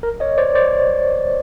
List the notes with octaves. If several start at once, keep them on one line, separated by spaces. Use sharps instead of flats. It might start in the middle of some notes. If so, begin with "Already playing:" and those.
A#4
C#5 D#5
C5 D5
C5 D5